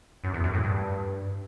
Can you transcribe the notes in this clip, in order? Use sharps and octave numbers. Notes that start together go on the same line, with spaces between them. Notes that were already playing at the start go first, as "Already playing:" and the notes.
F#2
E2
F#2
A2
G2